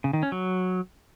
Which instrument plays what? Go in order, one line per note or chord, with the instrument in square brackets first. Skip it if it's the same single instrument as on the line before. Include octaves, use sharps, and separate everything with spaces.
[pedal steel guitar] C#3
D#3
C#4
F#3